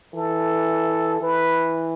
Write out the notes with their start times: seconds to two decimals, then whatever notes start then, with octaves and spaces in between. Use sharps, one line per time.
0.15 E3 A4
1.21 E3 B4